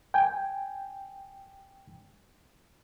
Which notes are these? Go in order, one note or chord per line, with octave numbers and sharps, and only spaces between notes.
G5 G#5